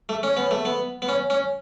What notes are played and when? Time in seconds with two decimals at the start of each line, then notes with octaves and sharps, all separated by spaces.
0.09 A3
0.23 C#4
0.37 B3
0.51 A3
0.65 B3
1.02 B3
1.09 C#4
1.30 C#4